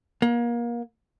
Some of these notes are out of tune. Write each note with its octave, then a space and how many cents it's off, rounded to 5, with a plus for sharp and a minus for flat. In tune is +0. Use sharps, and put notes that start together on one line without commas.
A#3 +30